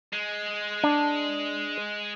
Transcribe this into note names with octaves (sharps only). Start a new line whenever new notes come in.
G#3
D4